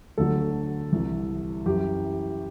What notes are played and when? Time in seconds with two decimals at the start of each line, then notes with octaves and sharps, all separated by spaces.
0.18 D2 D3 F#3 A4
0.92 C2 C3 E3
1.66 F#2 E3 G4